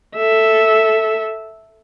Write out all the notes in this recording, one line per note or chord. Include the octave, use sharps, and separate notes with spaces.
A4 E5